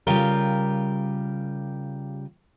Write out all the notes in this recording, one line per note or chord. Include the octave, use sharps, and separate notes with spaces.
C#3 G3 F4 G4 A#4